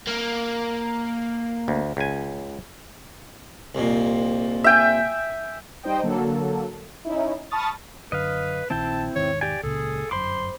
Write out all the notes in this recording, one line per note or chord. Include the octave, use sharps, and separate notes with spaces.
A#3
D2
C#2 G#5
C2 F2 A#2
E5 G5 G#5
G3 D#4 C5 D#5 G5
D3 F#3 A#3 A4
C#4 D#4 E4
A5 B5 C#6 D#6 F6 A6
F#2 D3 B4 D#5 F5
A#1 D#3 C4 E4 G5 A5
E1 G#2 D#3 C#5
G4 D5 G#5
C#2 A#2 C#3 G#4 A4
G1 F#2 C5 B5 C6 D6